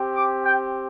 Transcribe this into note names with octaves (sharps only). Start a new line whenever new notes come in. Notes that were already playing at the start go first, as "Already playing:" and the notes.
Already playing: C4 G4
D6
G5